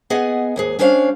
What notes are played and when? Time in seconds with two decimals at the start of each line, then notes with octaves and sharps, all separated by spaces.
0.10 B3 G#4 D#5 F#5 G#5
0.56 D#2 G#2 G#4
0.79 G3 C#4 D4 C5 C#5 F5